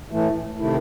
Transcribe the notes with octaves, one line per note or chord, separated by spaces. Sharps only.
A2 E3 A3
C3 D#3 A3 E4